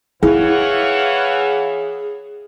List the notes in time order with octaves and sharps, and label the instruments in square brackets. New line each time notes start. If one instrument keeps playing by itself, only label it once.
[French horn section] E3 C#5 [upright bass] E4 [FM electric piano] G#4 [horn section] F5 F#5